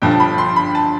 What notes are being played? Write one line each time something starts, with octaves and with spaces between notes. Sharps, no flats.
G1 G2 D3 F3 G5
A5
B5
C6
B5
A5